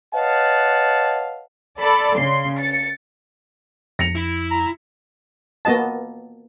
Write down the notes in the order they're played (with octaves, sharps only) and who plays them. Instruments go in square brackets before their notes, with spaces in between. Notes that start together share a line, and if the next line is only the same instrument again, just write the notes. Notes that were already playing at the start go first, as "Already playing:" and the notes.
[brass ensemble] B4 C#5 D#5 F5 F#5 A5
[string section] A4 D5 B5
C#3 C6
A6 C#7
[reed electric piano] F2 [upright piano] A#6 C#7 F7
[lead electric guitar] E4
[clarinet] A#5
[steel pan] A#3 B3 F#4 D#5 A5